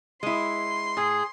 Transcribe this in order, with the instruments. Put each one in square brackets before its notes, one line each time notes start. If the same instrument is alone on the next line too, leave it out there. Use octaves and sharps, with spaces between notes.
[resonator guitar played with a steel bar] G#3 E4 [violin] C6
[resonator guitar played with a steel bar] A2 [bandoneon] G#4